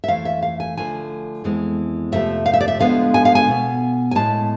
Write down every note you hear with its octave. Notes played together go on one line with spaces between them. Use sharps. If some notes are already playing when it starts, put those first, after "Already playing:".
E5
F2 E3 A3 F5
E5
F5
G#5
D2 D3 F3 A3 G#5
F2 E3 G#3 B3
F2 C3 F3 A3 E5
F5
E5
D5
E5
D2 D3 F3 G#3 B3 F5
G#5
F5
G#5
B2 B3
G#5
A2 G#3 B3 A5